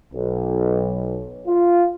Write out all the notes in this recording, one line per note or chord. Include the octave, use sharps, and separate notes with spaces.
B1
F4